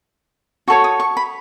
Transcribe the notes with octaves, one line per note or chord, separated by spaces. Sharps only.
F#4 A4 C#5 C#6
D#6
C#6
B5